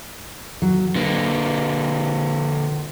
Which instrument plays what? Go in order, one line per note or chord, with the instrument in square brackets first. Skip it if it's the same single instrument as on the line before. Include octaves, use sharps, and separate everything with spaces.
[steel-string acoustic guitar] F#3
[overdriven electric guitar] D3 A#3 [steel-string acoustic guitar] B4